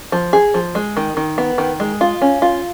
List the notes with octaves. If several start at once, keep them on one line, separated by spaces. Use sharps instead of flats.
F3
G#4
F3
G#3
D#3
D#3
B3
D#3
G#3
F4
C#4
F4